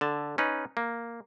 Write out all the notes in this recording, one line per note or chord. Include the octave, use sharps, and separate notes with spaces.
D3 A5
C#4 D#4 B4
A#3